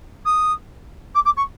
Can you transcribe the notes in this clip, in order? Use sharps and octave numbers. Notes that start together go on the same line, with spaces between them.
D#6
D6
D6
C#6